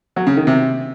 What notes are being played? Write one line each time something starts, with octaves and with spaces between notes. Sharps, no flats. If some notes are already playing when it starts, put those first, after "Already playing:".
F#3
C#3
D#3
C3